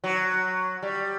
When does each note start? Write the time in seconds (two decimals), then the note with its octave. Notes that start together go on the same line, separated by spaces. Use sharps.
0.04 F#3
0.83 G3